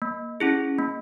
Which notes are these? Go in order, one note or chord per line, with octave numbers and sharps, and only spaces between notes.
A#3
C#4 E4 G#4
A#3